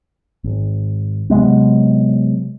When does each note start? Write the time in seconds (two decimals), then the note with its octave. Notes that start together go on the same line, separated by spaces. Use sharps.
0.44 G#1
1.30 C3 F#3 G#3 B3